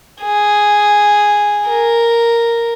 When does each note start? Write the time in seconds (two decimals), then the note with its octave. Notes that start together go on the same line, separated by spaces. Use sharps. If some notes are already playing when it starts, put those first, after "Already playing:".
0.22 G#4
1.69 A#4